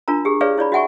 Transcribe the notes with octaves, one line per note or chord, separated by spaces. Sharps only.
D4 F4 A#4 A#5
G4 G#4
G#4 B4 C#5 D5 F5
E4 C#5 D5 B5
F#4 E5 F#5 G#5 C#6